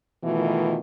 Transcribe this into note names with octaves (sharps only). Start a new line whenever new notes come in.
B2 D#3 E3 A3 F4